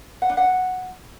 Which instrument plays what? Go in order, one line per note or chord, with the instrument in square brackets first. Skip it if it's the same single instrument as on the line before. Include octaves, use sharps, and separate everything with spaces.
[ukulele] F#5
D4
F#5